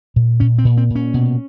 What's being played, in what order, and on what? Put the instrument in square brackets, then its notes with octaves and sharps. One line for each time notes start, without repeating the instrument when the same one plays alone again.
[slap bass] A#2
A#2 C#4
C4
A#2
C4
A#2
C#4
B2